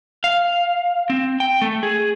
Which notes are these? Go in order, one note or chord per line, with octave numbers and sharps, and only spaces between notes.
F5
C4
G5
A3
G#4